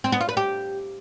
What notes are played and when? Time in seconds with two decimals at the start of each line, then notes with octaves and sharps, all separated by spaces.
0.04 C4
0.12 B3
0.21 F4
0.29 B4
0.37 G4